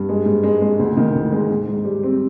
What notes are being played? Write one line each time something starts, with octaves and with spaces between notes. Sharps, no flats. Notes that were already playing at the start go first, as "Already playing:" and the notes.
Already playing: G2
G#3
G#2
G#3
G#3
D2
D#3
D2
G#3
G#2
G#2
G3
C4